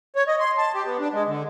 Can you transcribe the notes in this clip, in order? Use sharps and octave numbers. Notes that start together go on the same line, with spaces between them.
C#5
D#5
C6
A5
G4
B3
D4
G#3
D3